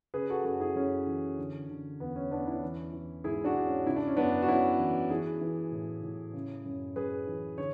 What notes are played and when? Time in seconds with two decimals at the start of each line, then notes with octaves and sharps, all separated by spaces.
0.14 C#3 G#4 B4
0.30 F#4 A4
0.45 F#2 F#4 A4
0.60 E4 G#4
0.76 F#2 C#4
1.07 E3
1.38 D3
1.69 D3
2.00 E2 B3
2.16 C#4
2.31 E2 B3 D4
2.46 C#4 E4
2.62 E3
2.93 E3
3.24 G#2 E4 G#4
3.44 D4 F#4
3.55 G#2
3.66 C#4
3.86 C#3 E4
3.96 D4
4.07 C#4
4.17 F#2 B3 D4
4.42 F#4
4.48 F#2 C#4 E4
4.79 E3
5.10 E3 E4 G#4
5.41 E3
5.72 A2
6.03 A2
6.34 C#3
6.65 F#2
6.96 F#2 G#4 B4
7.27 E3
7.58 D3 C#5